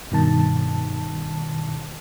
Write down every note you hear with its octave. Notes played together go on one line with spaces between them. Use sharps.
G2 B2 D#3 A5